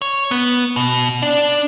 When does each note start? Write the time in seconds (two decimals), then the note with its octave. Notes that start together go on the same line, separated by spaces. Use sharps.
0.02 C#5
0.31 B3
0.76 B2
1.22 D4